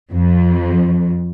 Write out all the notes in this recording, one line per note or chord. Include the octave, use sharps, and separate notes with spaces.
F2